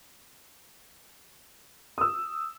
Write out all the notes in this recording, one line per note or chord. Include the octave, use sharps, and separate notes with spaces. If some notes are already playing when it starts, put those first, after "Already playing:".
D#6 E6